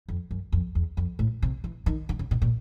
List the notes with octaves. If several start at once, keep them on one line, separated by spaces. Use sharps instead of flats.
F2
F#2
F2
E2
F2
A2
C3
E3
D#3
D3
C#3
B2
A#2